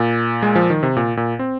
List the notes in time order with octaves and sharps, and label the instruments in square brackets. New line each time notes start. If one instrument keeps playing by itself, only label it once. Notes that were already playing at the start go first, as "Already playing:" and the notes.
Already playing: [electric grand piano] A#2
G#3
F3
D#3
C3
A#2
A#2
C4